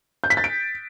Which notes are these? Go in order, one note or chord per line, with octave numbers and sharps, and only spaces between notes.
G6
B6
A6
D7